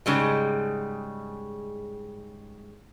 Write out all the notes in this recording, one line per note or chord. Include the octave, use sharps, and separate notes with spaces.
G#2 C#3 G3 G#3